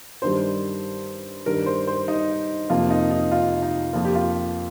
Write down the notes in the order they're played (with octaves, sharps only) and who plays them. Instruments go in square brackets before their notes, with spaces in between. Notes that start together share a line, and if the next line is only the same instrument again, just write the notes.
[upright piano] G2 D#3 G3 C5
G2 D#3 G3 A#4
C5
C5
D#4
F2 C3 F3 A#3 F4
D#4
D#4
F4
D#4
F2 F3 A#3 F4
G4
F4